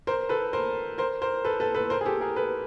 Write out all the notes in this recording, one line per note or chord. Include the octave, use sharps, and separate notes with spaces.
A#4 C5
A4 B4
A#4 C5
A#4 C5
A#4 C5
A4 B4
A4 B4
A4 B4
A#4 C5
G#4
G4 A4
G#4 A#4
A4 B4